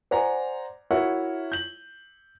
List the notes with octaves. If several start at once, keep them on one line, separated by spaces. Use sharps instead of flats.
C5 D5 F#5 G#5 A#5
E4 F#4 A#4 C#5 E5 F#5
G6 F#7